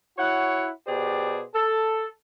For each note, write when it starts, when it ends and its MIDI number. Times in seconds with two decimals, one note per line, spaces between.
0.18 0.69 64
0.18 0.69 66
0.18 0.69 73
0.18 0.69 78
0.87 1.42 47
0.87 1.42 67
0.87 1.42 68
0.87 1.42 72
0.87 1.42 74
1.54 2.08 69